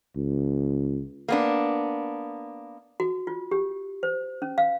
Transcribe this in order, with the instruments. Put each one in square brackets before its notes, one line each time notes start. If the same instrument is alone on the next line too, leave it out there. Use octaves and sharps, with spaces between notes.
[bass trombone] C#2
[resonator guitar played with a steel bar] A#3 B3 D4
[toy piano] F#4
F4
G4
C5
C#4
F5